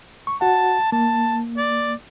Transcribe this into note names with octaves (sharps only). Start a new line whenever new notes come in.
C#6
F#4 F#5 A5
A#3 A5
D5